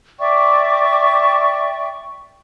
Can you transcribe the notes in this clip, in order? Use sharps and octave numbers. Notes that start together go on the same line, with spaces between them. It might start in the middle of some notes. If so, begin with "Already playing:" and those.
D5 E5 G5 C#6